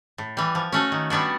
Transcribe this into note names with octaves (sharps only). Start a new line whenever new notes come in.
A2
E3 G3
F3
A3 C#4 F#4 A4
D#3
G3 B3 D4 F#4